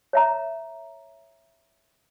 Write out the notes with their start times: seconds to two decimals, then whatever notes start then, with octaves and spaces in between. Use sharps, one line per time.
0.13 C#5 E5 A#5